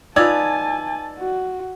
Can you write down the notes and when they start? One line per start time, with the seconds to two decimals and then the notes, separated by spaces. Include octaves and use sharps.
0.16 D#4 F4 B4 D5 G#5 A5 E6 G#6
1.19 F#4